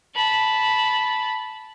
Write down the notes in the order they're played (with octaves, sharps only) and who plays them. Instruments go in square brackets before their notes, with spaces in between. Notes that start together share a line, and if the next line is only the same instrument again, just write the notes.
[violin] A5 B5